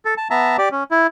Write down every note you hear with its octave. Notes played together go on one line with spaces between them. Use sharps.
A4
A5
B3 E5 A5 A#5
G4 D5
C#4
E4